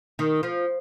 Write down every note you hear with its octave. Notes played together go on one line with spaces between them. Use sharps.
D#3
F3